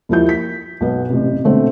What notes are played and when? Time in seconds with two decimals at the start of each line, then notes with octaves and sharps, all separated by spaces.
0.09 D#2 F3 E4 G6
0.29 B6
0.81 B1 B3
1.10 A1 C3
1.44 B2 D3 A3 C4